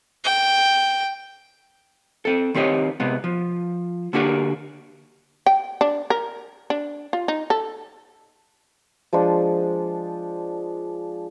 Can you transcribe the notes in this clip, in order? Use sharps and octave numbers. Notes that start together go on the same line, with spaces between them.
G5
C4 A4
D#3 C4 G4 C#5 D#5
C3 G#3 B3
F3
D3 A#3 D4 F#4 G4 A#4
G5
D4
A#4
D4
F4
D#4
A4
F3 G#3 D4 C6